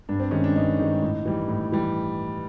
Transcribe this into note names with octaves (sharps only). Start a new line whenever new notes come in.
G2 D4
C4
D#3 G#3 C#4
D4
G2 D#4
D#3 G#3
A2
E3 G3
A2
E3 G3